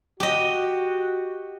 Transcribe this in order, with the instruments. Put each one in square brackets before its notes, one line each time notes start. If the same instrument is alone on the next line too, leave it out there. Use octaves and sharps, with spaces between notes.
[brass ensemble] F#4 [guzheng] G4 D#5